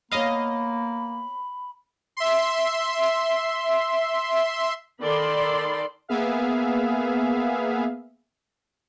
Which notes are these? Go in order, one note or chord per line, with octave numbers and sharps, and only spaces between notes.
A#3 B3 C#5 D#5 F5 B5
E5 C6
D#3 A4 D5 B5 C6
A#3 B3 G#4 E5 F5